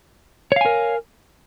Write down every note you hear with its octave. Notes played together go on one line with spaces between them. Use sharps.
A#4 C#5 F5 G#5